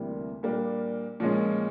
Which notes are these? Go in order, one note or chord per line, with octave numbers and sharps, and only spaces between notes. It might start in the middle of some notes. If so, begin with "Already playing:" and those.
Already playing: D2 C3 E3 G3 A#3
A#2 G3 A#3 D4
A#2 F3 G#3 C#4